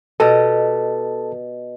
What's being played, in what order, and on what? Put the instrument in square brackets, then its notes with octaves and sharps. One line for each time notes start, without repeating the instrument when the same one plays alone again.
[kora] B2 G4 D#5 [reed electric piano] A4 A5